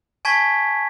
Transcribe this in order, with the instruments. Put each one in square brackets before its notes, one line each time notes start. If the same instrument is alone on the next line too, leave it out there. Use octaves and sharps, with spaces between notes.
[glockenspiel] G#5 A5 C#6 G#6 B6